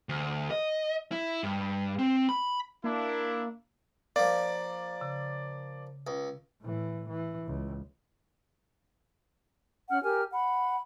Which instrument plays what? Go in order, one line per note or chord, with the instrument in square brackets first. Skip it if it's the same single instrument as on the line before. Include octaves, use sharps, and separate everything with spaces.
[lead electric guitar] D2
D#5
E4
G2
C4
B5
[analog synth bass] A#3 [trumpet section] D4 E4
[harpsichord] F3 A#3 [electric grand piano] D5 [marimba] F5
[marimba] C#3
[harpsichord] C#2
[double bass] A2 E3
E3
C#2
[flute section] C#4 F#5 F6
G4 A#4 G#5 F6
F#5 B5